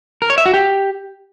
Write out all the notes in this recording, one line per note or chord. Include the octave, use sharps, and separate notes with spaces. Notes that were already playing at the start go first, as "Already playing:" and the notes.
A#4
C#5
E5
F#4
G4